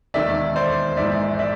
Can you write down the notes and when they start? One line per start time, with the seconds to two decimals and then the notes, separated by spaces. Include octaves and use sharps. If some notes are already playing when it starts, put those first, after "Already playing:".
0.14 E1 D#2 D#3 D5 E5
0.56 C5 D5
0.97 A#1 G#2 E3 D5 E5
1.39 D5 E5